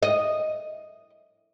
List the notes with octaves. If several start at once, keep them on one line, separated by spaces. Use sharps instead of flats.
D#5